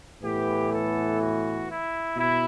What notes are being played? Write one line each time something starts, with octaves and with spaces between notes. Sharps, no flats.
A2 E3 B3 G4
A4
F#4
E4
B2 E4